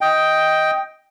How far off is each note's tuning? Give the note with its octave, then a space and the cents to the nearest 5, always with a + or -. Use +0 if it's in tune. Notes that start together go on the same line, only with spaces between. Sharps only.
D#5 +10 G5 +0